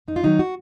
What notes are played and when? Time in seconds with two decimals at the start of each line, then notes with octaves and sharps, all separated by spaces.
0.08 F2 D#4
0.16 F4
0.23 D#3 F#3 D#4
0.39 F#4